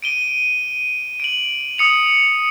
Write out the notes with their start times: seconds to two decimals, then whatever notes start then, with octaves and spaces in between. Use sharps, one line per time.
0.02 D7 D#7 G7
1.20 D7 F#7
1.78 D#6 C#7 F7